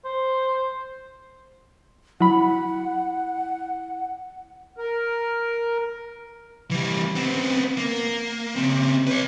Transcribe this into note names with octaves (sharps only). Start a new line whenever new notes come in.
C5
F#3 E4 F#5 B5
A#4
E3 G3
B3 C4
A#3
C#3 C4
B4 C#5